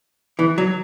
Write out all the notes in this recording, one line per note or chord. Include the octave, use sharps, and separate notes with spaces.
E3
F#3